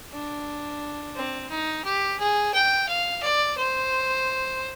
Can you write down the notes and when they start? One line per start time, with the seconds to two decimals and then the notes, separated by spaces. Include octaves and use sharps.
0.12 D4
1.16 C4
1.50 D#4
1.84 G4
2.19 G#4
2.54 G5
2.89 F5
3.23 D5
3.58 C5